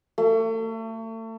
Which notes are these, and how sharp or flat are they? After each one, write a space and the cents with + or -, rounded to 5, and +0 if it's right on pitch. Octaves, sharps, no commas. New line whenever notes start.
A3 +35